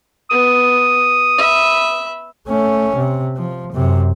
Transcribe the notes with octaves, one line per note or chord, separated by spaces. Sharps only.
B3 D#6
E5 B5
A3 C#4
C3
F3
F#2 C3